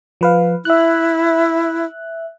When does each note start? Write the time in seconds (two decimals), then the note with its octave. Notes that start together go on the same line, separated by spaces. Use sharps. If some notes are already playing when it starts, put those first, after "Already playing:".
0.21 F3 B4 F5
0.65 E4 E5 F#6